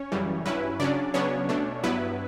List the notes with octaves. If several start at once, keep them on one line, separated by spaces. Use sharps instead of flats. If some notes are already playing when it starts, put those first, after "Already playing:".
Already playing: C#4 C#5
F#2 C#3 E3 G3
G2 F#3 C#4 E4 B4
C#3 F#3 C#4 D4 D5
C#3 F#3 B3 C#4 D4 C#5
B2 A3 D4
G2 F#3 B3 E4 B4